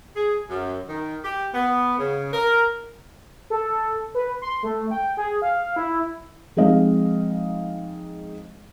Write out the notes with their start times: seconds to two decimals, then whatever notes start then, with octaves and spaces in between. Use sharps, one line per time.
0.16 G#4
0.50 F#2
0.89 D#3
1.25 G4
1.54 B3
1.99 C#3
2.33 A#4
3.50 A4
4.15 B4
4.42 C6
4.63 A3
4.91 G5
5.17 G#4
5.42 F5
5.76 E4
6.56 F3 G#3 C4 D#4 D#5 F5